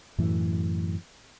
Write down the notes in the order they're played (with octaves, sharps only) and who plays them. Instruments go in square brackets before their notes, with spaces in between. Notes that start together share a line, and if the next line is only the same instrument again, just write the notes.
[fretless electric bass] F#2 A2 E3